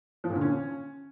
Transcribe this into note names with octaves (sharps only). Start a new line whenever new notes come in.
F3
A#2
D3
C#4